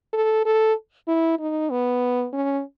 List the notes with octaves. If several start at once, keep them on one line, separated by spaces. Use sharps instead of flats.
A4
A4
E4
D#4
B3
C#4